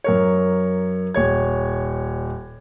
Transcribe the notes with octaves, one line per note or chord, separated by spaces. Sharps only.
F#2 A#4 C#5
D#1 C#5 G#6